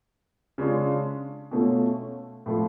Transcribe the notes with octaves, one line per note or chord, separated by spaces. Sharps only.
C#3 G#3 D4 F4
B2 A3 C#4 F4
A2 F3 A3 F4